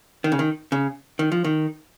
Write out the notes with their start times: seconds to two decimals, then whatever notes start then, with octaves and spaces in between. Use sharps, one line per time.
0.24 D#3
0.32 C#3
0.39 D#3
0.72 C#3
1.19 D#3
1.32 F3
1.44 D#3